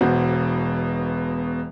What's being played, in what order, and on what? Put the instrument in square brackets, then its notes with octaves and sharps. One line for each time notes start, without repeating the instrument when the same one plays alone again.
[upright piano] E1 B2 F#4 C5